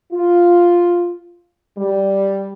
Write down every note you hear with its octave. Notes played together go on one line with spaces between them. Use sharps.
F4
G3